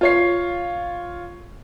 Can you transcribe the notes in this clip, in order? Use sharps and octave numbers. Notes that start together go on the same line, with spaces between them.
F4 C#5 C7